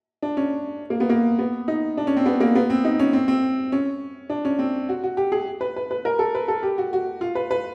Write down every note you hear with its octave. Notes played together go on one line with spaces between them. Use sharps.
D4
C#4
A#3
B3
A#3
B3
D#4
D4
C#4
C4
B3
A#3
B3
C4
D#4
C#4
C4
C4
C#4
D4
C#4
C4
F#4
F#4
G4
G#4
B4
B4
B4
A#4
A4
B4
A4
G4
F#4
F#4
F4
B4
B4